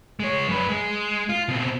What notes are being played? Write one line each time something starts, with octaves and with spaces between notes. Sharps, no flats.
G#3 C#5
F#2 B4
G#3
F4
B2 C4